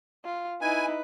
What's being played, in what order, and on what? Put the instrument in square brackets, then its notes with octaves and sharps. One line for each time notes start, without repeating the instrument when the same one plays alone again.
[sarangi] F4
[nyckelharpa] D#4 E4 [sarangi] B4 [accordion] G#5